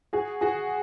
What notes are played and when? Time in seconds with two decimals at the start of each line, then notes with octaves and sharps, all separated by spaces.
0.13 F#4 G#4
0.41 F#4 G#4